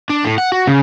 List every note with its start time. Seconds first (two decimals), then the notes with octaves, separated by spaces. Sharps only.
0.10 D4
0.25 A2
0.38 F#5
0.52 F#4
0.67 C#3